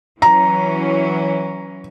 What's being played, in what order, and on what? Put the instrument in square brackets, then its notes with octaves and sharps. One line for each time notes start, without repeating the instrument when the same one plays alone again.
[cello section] E3 F#3 C#4 [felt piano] A#5